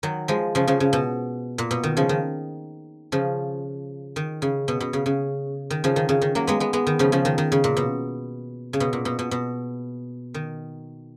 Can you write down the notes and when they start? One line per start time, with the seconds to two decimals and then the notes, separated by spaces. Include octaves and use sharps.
0.03 D#3 F#3
0.28 F3 G#3
0.55 C#3 F3
0.67 C#3 F3
0.80 C#3
0.93 B2
1.58 A#2
1.71 B2
1.83 D#3
1.97 C#3 F3
2.09 D#3
3.12 C#3 F3
4.16 D#3
4.42 C#3
4.68 B2
4.80 B2
4.93 C#3
5.06 C#3
5.70 D#3
5.84 C#3 F3
5.96 D#3
6.09 C#3
6.22 D#3
6.35 F#3 A#3
6.47 G#3 B3
6.60 G#3 B3
6.73 G#3 B3
6.87 D#3
6.99 C#3 F3
7.12 C#3 F3
7.25 D#3
7.38 D#3
7.52 C#3
7.64 A#2
7.77 B2
8.73 C#3
8.80 B2
8.93 A#2
9.05 B2
9.19 B2
9.31 B2
10.34 D#3